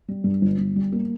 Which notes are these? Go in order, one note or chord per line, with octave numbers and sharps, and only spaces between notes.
G3
G2
G1
G1
G3
A#3